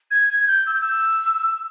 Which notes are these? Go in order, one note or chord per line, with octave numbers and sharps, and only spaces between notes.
G#6
G#6
G#6
G6
E6
G6
E6